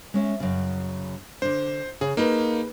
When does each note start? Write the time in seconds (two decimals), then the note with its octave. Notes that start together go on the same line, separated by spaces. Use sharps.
0.14 G#3 C#4 E5
0.40 F#2 C#3
1.42 D3 D4 C5
2.01 C#3 G#4
2.17 A#3 D#4 G#4 B4